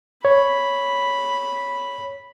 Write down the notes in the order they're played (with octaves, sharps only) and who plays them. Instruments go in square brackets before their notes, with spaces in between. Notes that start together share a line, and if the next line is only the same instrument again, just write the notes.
[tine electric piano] C#5 [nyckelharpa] B5